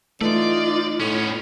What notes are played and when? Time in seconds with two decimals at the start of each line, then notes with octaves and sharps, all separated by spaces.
0.21 E3 A3 D#4 F4 D5
1.00 A2 B3 C#4